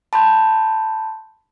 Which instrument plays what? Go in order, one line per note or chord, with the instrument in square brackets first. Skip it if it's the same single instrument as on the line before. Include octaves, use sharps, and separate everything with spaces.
[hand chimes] A5 B5 C6 G6